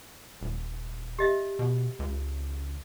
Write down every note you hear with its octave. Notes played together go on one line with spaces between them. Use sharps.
D#1
G4 D#5 E5
B2
C#2